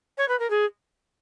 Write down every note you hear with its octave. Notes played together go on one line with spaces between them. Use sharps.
C#5
B4
A#4
G#4